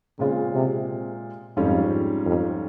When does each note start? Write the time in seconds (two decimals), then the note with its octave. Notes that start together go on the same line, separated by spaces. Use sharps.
0.19 A#2 C#3 G#3 C4 F4
0.54 C3
1.57 F2 G#2 G3 C#4 F4 C5
2.25 F2